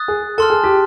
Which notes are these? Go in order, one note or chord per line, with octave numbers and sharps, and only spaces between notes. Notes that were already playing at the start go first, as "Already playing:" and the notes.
Already playing: D#6 F#6 A6
G#4
A4 A5 C6 F6
G#4
G4